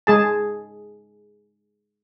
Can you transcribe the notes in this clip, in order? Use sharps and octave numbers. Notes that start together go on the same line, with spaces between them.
G#3 G#4 A5